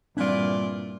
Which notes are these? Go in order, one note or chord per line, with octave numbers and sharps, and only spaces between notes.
G2 A#2 E3 G3 C4 D4 F4 D5